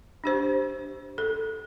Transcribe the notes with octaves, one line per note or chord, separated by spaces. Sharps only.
D4 G4 C5
A4